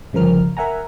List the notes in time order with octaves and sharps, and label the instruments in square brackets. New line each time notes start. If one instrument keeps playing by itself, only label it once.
[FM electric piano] G1 C#3 F3 A#4 F6
A#4 E5 F#5 G#5 A#5